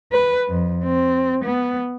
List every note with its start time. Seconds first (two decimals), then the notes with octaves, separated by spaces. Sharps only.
0.12 B4
0.48 F2
0.84 C4
1.44 B3